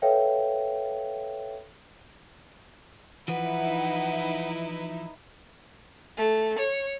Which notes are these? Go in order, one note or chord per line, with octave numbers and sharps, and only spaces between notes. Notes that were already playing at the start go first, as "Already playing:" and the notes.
A4 B4 C#5 E5 F5 G5
E3 F3 D#4 E4 B4 F#5
A3
C#5